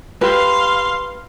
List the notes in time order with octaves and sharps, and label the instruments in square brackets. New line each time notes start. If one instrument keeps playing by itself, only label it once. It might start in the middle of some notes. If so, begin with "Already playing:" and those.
[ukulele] G4 B4 [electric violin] F5 C6